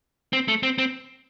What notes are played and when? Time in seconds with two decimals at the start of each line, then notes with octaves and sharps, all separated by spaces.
0.33 C4
0.48 A3
0.63 C4
0.78 C4